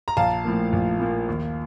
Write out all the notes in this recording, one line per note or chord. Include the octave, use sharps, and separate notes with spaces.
A#5
A#1 F5 A5
A2 F3 A#3
A#1
A2 F3 A#3
D#2